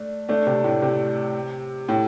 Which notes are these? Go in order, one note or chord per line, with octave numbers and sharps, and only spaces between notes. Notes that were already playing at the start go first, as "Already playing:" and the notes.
Already playing: A3 D4
A3 D4
C3
A2
C3
A2